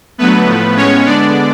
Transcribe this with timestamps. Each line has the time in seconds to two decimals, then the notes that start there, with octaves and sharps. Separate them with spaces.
0.18 D3 F#3 A3 B3 B4
0.47 A2 F3 A3
0.76 A2 G#3 B3 C#4 C#5
1.05 D3 G#3 B3 D4 D5